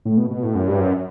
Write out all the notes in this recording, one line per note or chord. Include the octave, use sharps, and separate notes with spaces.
A2
B2
B2
A2
F#2
G2
F#2